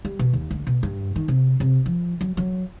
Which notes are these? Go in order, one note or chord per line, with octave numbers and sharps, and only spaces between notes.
G3
B2
D#2
D2
B2
G2
D#3
C3
C3
F3
F#3
F#3